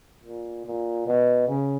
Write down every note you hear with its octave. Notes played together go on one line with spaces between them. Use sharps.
A#2
A#2
B2
C#3